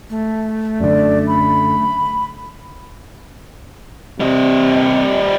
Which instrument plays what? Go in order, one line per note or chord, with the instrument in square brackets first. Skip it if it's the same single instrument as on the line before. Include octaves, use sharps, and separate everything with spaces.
[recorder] A3
[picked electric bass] F#2 D3 [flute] D5
[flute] B5
[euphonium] C3 [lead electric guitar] G3 D#5